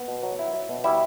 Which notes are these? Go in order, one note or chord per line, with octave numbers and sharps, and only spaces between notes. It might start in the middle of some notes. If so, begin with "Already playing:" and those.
Already playing: B3
B2
F#3
E4
F#3
B2
G3 E4 E5